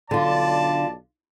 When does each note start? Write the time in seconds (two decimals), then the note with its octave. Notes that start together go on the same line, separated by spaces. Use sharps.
0.11 B1 D3 F4 D5 A5